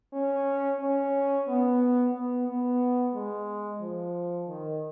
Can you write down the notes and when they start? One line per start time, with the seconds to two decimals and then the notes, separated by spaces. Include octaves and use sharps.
0.13 C#4
0.80 C#4
1.48 B3
2.14 B3
2.48 B3
3.14 G#3
3.81 F3
4.48 D#3